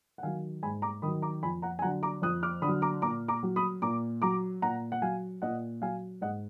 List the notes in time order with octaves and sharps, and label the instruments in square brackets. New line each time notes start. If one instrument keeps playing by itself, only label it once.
[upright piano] F#5
D#3 F#3 F5 G#5
G#2 G#5 B5
A#5 D6
D#3 B5 D#6
F#3
A#5 D6
F2 G#5 B5
F#5 A#5
G#5
D3 F#3 F#5 A#5
A#5 D6
F2 D#6 F#6
D6 F6
D3 B5 D#6
F#3
A#5 D6
A#2 A#5 D6
A#5 D6
F#3
B5 D#6
A#2 A#5 D6
F#3 A#5 D6
A#2 F#5 A#5
F#5
F#3 F5 G#5
A#2 D#5 F#5
F#3 F5 G#5
G#2 D#5 F#5